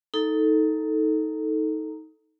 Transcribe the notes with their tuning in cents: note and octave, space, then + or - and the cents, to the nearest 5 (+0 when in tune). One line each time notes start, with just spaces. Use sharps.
D#4 +20 A4 +0 A#5 +0